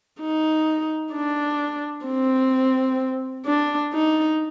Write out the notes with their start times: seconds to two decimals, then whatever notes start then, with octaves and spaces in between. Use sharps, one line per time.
0.20 D#4
1.13 D4
2.06 C4
3.46 D4
3.93 D#4